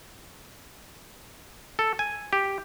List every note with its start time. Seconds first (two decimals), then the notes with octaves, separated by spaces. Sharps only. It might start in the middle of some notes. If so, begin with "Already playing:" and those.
1.79 A4
1.99 G#5
2.33 G4